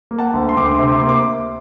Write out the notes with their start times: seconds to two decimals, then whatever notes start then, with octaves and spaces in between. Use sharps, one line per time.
0.11 A#3
0.19 F#5 A5
0.34 D2
0.49 C6
0.57 D2 D6
0.66 C6
0.75 D6
0.79 C3 C6
0.91 D6
1.00 A#3 C6
1.09 D6